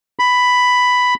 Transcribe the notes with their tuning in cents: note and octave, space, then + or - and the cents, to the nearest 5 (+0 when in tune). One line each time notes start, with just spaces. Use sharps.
B5 +5